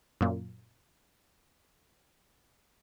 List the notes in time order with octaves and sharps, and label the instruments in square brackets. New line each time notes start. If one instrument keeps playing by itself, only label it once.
[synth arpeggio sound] F#2 A#2